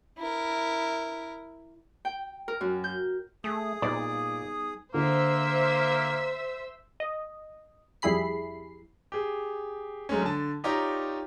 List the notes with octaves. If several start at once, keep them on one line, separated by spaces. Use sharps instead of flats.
E4 A#4
G5
A#4
F#2
G6
A3 G#4 D#6
A#2 G3 B3 D#4 D5
D3 A#3 C5 E5 E6
D#5
F2 G3 E4 G#4 B5 C7
G4 G#4
F#3 G#3 A3 C#4
D3 A5
D#4 F4 G4 C#5 D5 A#5